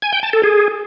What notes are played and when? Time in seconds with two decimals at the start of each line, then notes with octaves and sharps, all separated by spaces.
0.02 G#5
0.13 G5
0.23 A5
0.33 A4
0.44 G#4